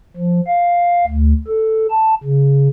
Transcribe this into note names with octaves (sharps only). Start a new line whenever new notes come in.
F3
F5
D2
A4
A5
C#3